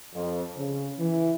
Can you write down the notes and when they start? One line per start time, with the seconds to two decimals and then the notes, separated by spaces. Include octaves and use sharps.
0.14 F2
0.57 C#3
0.98 E3